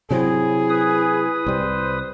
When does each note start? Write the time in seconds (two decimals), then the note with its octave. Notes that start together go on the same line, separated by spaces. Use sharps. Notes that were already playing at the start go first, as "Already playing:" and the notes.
0.11 C3 F#3 C4 E4 G#4
0.70 B4 D#6
1.46 C2 G3 C5